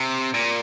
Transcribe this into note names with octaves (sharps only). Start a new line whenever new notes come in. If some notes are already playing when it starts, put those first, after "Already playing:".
Already playing: C3
A#2